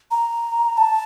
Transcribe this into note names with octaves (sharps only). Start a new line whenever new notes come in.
A#5
A5